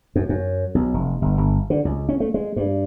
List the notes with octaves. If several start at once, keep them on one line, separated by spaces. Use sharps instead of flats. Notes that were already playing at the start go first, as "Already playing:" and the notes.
F#2
F#2
B1
F1
G1
G1
D3
C#2
C#4
A3
G#3
G2